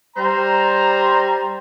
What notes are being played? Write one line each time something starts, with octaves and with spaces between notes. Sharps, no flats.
G3 C5 A#5